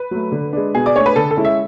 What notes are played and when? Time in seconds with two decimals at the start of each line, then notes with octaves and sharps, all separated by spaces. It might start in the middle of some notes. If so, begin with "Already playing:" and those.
Already playing: B4
0.11 F#3 A3
0.32 D3
0.53 G#3 D4
0.75 B2 G#4
0.86 D5
0.96 A3 D4 C#5
1.06 B4
1.16 D3 A4
1.31 A4
1.37 G#3 C#4 E4
1.45 E5